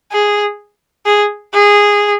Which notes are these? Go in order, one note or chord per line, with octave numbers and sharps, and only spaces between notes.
G#4
G#4
G#4